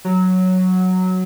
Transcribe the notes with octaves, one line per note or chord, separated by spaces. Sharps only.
F#3